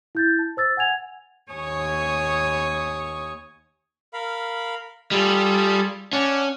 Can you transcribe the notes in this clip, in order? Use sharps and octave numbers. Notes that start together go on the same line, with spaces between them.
E4 G6 A6
A5
C5 E6 A6
F#5 G#5 G#6 F7
D#2 C#5 G#5 C#6 D#6
A#4 F5 B5
G3 F4 G#4 A4
C#4 D5 F#5 A5